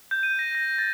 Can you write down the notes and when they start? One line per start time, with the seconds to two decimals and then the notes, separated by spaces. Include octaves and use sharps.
0.11 G6
0.23 D#7
0.39 A#6
0.55 A#6
0.78 A6